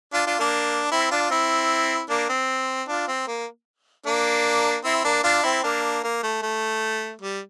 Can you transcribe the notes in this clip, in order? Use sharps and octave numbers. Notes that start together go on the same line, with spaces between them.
D4 F4
D4 F4
A#3 D4
C4 E4
D4 F4
C4 E4
A#3 D4
C4
D4 F4
C4
A#3
A#3 D4
C4 E4
A#3 D4
D4 F4
C4 E4
A#3 D4
A#3
A3
A3
G3